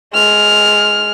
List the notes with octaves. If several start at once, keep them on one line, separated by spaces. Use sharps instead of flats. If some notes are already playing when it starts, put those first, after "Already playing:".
G#3 F6